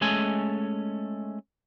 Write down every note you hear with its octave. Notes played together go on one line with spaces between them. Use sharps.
G#3 A3 C#4 A4 G#5